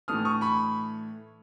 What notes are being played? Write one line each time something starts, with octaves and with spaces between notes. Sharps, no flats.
A2 E3 A3 D4 D#6 F6
C#6 D#6
B5 C#6